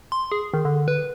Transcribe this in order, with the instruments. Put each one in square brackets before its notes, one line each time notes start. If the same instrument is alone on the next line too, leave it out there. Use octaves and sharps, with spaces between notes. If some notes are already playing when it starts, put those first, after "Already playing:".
[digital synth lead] C6
G#4
D#3
D3
B4